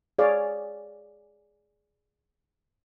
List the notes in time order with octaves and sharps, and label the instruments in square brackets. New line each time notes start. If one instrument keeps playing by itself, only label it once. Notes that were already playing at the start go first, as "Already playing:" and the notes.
[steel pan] G#4 C#5 D5 F5